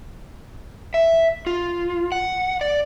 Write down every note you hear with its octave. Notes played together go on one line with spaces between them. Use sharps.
E5
F4
F#5
D5